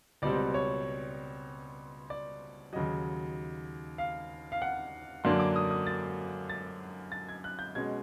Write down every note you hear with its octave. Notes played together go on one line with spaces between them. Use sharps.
C#2 B2 G3 C4 D5
C#5
D5
D#2 C#3 F#3 D#5
F5
F5
F#5
F#2 D3 F#3 A#3 D4 C6
D6
D#6
D#6
A6
A6
A6
G#6
F#6
G6
B2 G#3 C#4 G#6